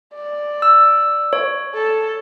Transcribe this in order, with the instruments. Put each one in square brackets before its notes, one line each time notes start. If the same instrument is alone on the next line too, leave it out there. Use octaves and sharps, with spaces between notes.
[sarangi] D5
[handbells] E6
C#5
[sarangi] A4